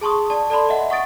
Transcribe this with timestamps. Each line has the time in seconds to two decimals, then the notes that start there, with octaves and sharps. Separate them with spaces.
0.01 G#4 A5 C6 C#6 D#6
0.30 D5 A5
0.50 A4 D5 A5 B5 C6
0.69 D#5 E5 F#5
0.90 F#5 C#6 D#6 A6 D7